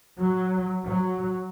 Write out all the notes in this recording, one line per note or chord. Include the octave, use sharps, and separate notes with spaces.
F#3
F#3